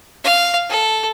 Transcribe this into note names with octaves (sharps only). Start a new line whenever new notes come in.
F5
A4